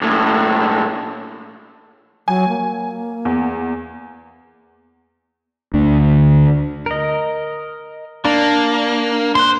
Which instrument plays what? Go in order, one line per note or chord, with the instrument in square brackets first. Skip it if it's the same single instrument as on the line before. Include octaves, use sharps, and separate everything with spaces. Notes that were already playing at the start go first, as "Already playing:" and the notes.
[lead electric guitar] B1 A2
[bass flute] F#3 [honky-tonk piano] G#5
[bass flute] A#3
[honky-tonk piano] E2
[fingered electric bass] D2 D3
[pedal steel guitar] A#4 D#5
[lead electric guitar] A#3 [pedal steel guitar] D4
[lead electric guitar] C5 [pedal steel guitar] C6 F#6